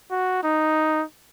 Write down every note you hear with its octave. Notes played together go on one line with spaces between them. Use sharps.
F#4
D#4